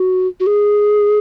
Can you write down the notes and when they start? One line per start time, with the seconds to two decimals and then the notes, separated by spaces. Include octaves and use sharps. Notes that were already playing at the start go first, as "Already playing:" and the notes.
Already playing: F#4
0.40 F#4
0.47 G#4